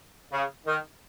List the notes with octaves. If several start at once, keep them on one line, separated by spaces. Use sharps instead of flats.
C#3
D#3